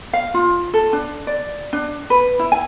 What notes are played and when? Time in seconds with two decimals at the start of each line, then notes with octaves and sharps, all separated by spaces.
0.13 F5
0.34 F4
0.74 A4
0.93 D4
1.27 D5
1.73 D4
2.10 B4
2.39 E4
2.52 G#5